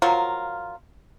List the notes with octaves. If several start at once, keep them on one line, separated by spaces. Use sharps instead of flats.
F3 F#3 F4 A#4